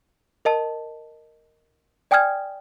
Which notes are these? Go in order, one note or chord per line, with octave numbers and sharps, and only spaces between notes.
A#4 D#5 A5
D5 G5 G#5 D#6 F6 G#6